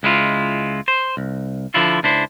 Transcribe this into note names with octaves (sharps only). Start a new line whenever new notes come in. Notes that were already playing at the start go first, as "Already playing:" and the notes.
C#2 G#3 E4 F4
C5
C2
D3 F3 D4 E4 F4
C#2 D4 E4 C5